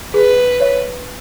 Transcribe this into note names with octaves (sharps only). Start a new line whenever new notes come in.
G#4 B4
C#5 E5